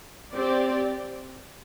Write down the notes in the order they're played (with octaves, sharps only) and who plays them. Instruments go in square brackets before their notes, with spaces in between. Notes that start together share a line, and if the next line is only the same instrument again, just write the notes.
[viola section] C4 G4 D5